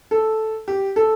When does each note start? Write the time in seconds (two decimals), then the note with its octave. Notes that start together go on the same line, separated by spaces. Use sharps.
0.11 A4
0.68 G4
0.96 A4